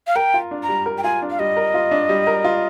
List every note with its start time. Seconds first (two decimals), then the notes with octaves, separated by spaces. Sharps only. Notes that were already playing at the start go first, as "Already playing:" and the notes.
0.07 F5
0.16 A#4 G5
0.34 F4
0.51 D4
0.63 A#5
0.69 G3
0.86 A#4
0.98 G5
1.03 F4 G#5
1.22 D4
1.30 F5
1.39 G3 D#5
1.57 A#4
1.74 F4
1.91 D4
2.09 G3
2.27 A#4
2.44 F4